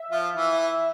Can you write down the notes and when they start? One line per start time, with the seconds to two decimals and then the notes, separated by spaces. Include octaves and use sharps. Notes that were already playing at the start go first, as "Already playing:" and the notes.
Already playing: E5
0.10 F3 F4
0.36 E3 E4